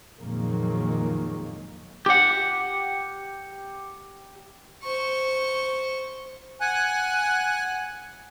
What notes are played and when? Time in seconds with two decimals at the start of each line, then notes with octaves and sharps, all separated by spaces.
0.19 F2 A#2 D#3 F#3 G#3 A#3
2.06 G4 F#5
4.83 C5 C#6
6.61 F#5 G#5 F#6